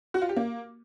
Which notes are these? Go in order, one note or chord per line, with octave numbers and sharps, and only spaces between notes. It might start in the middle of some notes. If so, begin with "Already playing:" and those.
F#4
F4
G4
A#3